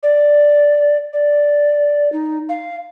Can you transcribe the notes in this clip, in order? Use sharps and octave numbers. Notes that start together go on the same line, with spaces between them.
D5
D5
D#4
F5